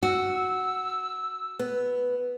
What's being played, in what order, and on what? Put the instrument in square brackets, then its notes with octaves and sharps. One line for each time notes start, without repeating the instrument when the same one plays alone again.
[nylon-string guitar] F#4 [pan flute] E6
[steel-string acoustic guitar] B3